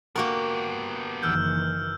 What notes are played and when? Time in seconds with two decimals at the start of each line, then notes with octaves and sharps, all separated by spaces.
0.16 A#3 B3 F#4 G4 A#4
1.23 F#1 D#3 E3 E6 F6 G6